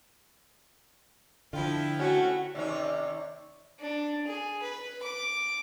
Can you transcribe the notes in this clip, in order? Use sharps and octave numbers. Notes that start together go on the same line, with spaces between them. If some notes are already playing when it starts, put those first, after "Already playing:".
D3 F3 E4 F4 G5
A3 C#4 F#4
D#2 C3 C#4 D5
D4
G#4
B4
D6